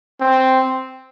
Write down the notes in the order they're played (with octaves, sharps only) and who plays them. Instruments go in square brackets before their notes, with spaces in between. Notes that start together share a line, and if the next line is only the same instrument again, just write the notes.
[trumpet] C4